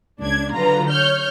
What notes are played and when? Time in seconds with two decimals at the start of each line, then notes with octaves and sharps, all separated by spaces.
0.22 C#2 D4 G#6
0.55 D3 F#3 F4 B4 A#5
0.91 C#5 F6 G6